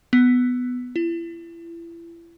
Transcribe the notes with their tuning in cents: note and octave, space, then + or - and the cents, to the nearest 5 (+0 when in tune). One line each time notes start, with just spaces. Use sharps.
B3 +10
E4 +35